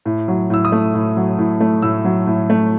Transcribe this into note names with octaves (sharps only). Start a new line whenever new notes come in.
A2
F#3
A2 E6
D#6
A3
A2
F#3
A2
A3
A2 E6
F#3
A2
A3